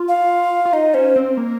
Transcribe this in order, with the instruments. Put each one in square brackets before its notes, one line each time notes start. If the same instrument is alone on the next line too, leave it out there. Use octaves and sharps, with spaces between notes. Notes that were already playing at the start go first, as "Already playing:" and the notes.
Already playing: [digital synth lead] F4
[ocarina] F5
[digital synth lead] F4
[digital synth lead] D#4 [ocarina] D#5
[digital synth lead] C#4 [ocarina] C5
[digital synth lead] C4
A#3